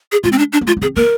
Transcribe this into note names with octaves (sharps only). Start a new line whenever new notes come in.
G#4
G#3 F4
C4
D4
D4
A#3
G#3 F4
A#3
C4 G#4
A#3 A#4